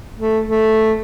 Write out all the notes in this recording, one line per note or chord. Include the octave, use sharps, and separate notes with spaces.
A3
A3